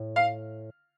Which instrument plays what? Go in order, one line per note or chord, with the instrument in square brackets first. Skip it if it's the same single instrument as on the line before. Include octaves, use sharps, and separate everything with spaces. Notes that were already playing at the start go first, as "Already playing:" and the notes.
Already playing: [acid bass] A2
[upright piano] F5